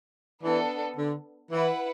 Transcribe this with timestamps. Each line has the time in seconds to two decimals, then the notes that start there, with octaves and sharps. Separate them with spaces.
0.43 E3 B3 D4 A4
0.97 D3
1.51 E3 E4 B4 F#5